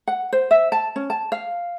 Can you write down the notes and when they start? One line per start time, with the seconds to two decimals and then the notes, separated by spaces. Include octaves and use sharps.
0.08 F#5
0.33 C5
0.51 E5
0.72 A5
0.96 C#4
1.10 A5
1.32 F5